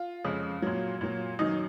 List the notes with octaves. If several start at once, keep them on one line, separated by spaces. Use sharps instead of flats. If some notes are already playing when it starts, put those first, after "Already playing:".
Already playing: F4
F2 C#3 G#3
A#2 F#3
A#2 F#3
F#2 D#3 F#3 D#4